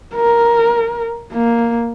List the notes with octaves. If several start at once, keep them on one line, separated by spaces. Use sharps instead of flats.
A#4
A#3